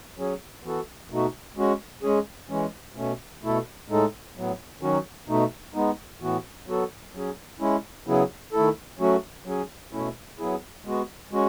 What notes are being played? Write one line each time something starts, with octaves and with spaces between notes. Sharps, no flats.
F#3 C#4 G#4
E3 B3 F#4 A4
B2 A3 D#4 F#4
G#3 C#4 F#4
G#3 C#4 G#4
E3 G#3 C#4
B2 A3 C#4
B2 A3 E4 A4
A2 G#3 D#4 A4
A2 F#3 B3
D#3 F#3 C#4 F#4
B2 A3 D#4
G#3 B3 D#4
A2 E3 B3 F#4
F#3 B3 F#4 A4
F#3 C#4 G#4
G#3 C#4 E4
C#3 F#3 B3 E4 G#4
D#3 A3 E4 A4
F#3 A3 C#4 F#4
F#3 C#4 G#4
B2 A3 C#4 E4
F#3 B3 E4 G#4
G#3 B3 F#4
G#3 C#4 F#4